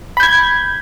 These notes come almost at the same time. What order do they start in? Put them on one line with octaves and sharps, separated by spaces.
B5 G6 G#6